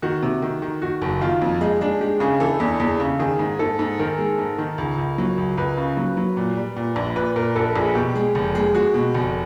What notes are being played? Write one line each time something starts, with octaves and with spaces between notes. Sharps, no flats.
D#3 F#4
C3
D#3
D#3
D#3 F#4
F#1
D#3 F4
F2
G#3 D#4
G#3 D4
G#3 G4
C#3 G#4
E3 A4
E2
E2 G#4
C#3
D#3 G#4
G#2
G#2 A4
G#2
D#3 A#4
G#3
G#2
D#3
C#2
C#2
F#3
C#2
C#2 B4
C#3
F#3
F#3
A#2
G3
A#2
A#1
A#2 B4
A#2 A#4
A#1 A4
A#1 G#4
B2 G4
G#3
F1
G#3
G#3 F#4
B2
F1